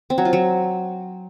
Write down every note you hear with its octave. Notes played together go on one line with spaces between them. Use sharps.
C4
F#3
F4
F#3